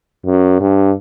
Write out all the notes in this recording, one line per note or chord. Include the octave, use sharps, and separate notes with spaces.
F#2
G2